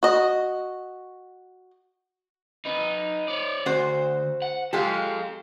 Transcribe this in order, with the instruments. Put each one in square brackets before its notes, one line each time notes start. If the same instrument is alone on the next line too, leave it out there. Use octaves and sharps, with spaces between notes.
[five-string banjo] F#4 D#5
[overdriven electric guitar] D#4 B4
C#5 D5
[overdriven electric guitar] D2 [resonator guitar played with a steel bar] F#4 C5
[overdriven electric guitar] F#5
[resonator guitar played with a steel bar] G#3 F4 G4 [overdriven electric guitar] A4 F5